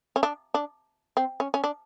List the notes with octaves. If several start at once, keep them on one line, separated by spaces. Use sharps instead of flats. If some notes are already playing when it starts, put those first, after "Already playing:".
C#4
D4
D4
C4
C#4
C#4
D4